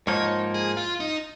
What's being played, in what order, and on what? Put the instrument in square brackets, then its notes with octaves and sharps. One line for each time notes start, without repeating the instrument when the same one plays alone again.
[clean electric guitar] G#2 F3 A#3 D#4 [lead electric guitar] C#5
[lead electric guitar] G#4
F4
D#4